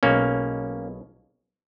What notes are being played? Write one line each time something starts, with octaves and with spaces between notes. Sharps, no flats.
B1 B2 G#3 A#3 C#4